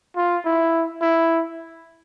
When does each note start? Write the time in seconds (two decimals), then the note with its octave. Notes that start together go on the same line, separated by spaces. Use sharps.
0.16 F4
0.45 E4
1.01 E4